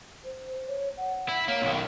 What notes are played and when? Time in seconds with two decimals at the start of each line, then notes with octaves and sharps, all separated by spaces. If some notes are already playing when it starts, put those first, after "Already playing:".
0.25 C5
0.68 C#5
0.97 F#5
1.29 E4
1.48 A#3 C#5
1.62 B1 D#3